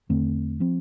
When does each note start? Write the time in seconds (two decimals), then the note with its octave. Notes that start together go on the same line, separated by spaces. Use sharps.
0.09 E2 D3 A3 C4
0.60 F3 C4